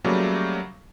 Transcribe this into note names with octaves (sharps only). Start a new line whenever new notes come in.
C#3 F#3 G3 A3 A#3